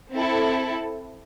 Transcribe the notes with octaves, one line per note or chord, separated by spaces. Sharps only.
C4 E4 A4